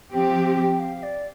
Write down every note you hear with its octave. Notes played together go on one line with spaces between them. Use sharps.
F3 C4 G4 G5
G5
F5
D5